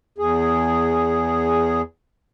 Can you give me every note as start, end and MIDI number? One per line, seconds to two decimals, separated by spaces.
0.18 1.82 40
0.18 1.82 68